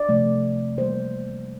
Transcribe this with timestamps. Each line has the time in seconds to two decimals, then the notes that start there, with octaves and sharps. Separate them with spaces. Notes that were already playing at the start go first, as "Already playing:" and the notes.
Already playing: D5
0.09 C3 F3 A3
0.78 E3 G3 A#3 C5